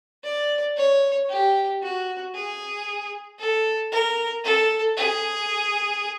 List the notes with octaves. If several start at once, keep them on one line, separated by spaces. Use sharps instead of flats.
D5
C#5
G4
F#4
G#4
A4
A#4
A4
G#4